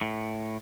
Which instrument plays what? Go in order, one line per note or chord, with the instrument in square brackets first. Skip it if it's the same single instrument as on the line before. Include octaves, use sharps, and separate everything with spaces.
[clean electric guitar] A2